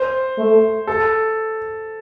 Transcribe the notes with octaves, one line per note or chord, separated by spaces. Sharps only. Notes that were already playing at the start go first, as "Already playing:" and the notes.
Already playing: C5
A3
A4